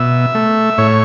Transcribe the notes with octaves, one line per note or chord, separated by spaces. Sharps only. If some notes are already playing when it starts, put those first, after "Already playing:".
Already playing: B2 E5
A3
A2 C#5